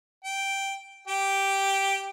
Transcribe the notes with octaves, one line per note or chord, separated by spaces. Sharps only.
G5
G4 G5